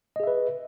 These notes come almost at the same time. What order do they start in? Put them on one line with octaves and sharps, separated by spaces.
D#5 G#4 E5 B4